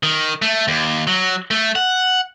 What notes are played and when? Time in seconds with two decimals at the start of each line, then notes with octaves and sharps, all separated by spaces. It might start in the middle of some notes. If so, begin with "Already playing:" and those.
0.03 D#3
0.42 A3
0.68 D#2
1.07 F#3
1.51 A3
1.76 F#5